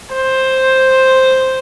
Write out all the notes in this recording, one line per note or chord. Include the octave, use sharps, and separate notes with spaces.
C5